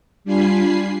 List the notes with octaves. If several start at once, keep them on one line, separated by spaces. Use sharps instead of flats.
G3 D4 F4 G#5 B5 C7